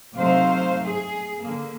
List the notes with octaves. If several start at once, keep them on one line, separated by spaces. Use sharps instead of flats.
C3 F#3 A3 D#4 C5 F5
G#4
D3 A#3